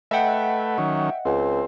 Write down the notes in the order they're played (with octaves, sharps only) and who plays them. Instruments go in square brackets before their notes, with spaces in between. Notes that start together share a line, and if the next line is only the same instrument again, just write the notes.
[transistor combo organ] A3 B4 [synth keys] D#5 F#5 [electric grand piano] E5 G5
[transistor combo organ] D#3 F#3 C#4
[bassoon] C#2 [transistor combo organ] C4